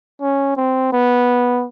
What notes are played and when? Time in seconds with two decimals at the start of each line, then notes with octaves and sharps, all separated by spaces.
0.21 C#4
0.57 C4
0.92 B3